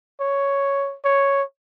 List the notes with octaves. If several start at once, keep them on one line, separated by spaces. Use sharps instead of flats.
C#5
C#5